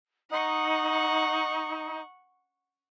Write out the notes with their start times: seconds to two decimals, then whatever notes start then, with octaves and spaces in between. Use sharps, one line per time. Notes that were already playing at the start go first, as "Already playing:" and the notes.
0.30 D#4 F#5 C#6